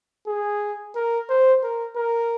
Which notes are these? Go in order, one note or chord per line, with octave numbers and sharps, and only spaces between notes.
G#4
A#4
C5
A#4
A#4